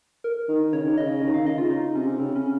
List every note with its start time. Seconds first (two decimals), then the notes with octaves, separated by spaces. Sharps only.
0.24 A#4
0.48 D#3
0.72 C#3 C#5
0.82 D#3
0.94 C#3 D#5
1.21 D#3
1.34 F5
1.45 C#3 D#5
1.58 F4
1.71 D#4
1.95 C3 C#4
2.19 C#3 C4
2.36 C#4